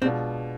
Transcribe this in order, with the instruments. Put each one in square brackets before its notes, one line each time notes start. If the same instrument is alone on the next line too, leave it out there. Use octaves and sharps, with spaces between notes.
[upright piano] B2 G#3 D4 F4 [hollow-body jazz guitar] C4